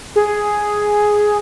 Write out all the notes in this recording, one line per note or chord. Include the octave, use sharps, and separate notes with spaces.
G#4